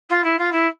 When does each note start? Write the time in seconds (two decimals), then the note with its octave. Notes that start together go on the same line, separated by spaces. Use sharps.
0.10 F4
0.24 E4
0.38 F4
0.52 E4